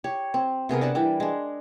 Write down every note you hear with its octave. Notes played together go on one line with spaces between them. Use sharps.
G4 C#5
C4
C3 B3 G#4 A#4
D4 A#4 F#5 A5
E3 G3 G5
G#3 D4